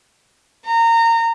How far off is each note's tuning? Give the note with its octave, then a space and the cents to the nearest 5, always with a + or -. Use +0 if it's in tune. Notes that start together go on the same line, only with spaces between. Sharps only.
A#5 -20